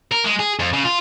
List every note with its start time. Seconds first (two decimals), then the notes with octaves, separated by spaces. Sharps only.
0.12 A#4
0.25 G#3
0.39 G#4
0.60 F2
0.74 C#3
0.85 F4